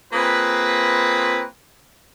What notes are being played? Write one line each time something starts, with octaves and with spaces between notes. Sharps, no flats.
A#3 C4 F4 G#4 B4